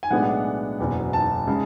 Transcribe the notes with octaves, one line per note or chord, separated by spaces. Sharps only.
G#5
B1 A2 G#3 B3 D4 F#5
F#1 E2 B2
A5
C#3 G#3